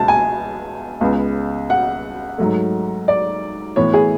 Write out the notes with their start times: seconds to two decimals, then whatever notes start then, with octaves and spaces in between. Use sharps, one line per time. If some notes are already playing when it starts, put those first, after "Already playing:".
Already playing: C#2 B2 G#3 B3 A5
0.08 G#5
1.01 C#2 C#3 G#3 B3
1.70 F#5
2.38 G#2 F#3 A3
3.08 D5
3.76 A2 E3 B3 C#5
3.94 G#4